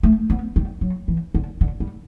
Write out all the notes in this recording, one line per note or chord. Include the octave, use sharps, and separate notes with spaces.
A3
B3
G3
F#3
E3
D3
D3
G3